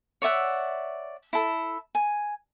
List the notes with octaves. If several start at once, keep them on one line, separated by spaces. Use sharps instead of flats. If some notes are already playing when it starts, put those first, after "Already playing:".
C#5 D5 E5 F#5
E4 A4
G#5